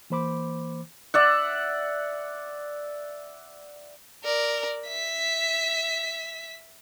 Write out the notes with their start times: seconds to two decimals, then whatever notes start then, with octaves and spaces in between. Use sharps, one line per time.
0.10 E3 A#3 C5 B5 D6
1.14 D5 E5 F#5
4.24 A#4 D5
4.88 E5 B6